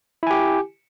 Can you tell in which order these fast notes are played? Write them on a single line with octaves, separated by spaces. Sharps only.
E4 G#5 G4